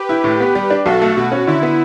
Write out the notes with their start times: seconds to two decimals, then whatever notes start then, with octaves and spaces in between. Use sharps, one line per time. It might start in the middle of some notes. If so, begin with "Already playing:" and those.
Already playing: G4 B4
0.09 E4
0.24 A2
0.40 B3
0.55 G3
0.70 D4
0.85 B1 F#4 A4
1.02 A3
1.16 B2 F#4
1.32 C#4
1.47 D3 E4
1.63 B3